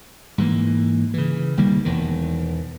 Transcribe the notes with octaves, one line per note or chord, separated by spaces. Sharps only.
G#2 E3 A#3
C#3 E3
C2 D#3 G3 A#3
E1 E2 D#3